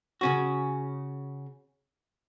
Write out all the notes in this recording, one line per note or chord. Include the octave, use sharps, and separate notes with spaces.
C#3 C#4 F#4